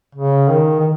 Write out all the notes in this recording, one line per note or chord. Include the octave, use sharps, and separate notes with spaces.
C#3
D#3
D#3